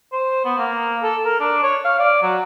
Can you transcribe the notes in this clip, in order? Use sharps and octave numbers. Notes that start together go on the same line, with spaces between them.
C5
B3
A#3
A4
A#4
D4
C#5
F5
D5
F#3